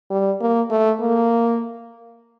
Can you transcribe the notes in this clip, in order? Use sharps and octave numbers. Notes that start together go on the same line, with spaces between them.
G3
A#3
A3
A#3